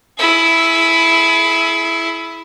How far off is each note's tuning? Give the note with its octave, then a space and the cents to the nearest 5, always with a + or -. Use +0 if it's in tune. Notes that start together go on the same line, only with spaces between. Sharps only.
E4 +0 G#4 +35